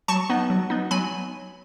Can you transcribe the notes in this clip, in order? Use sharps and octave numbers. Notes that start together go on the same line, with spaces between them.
F#3 A5 C#6
B3 D#4
F#3
B3 D#4
F#3 G#5 B5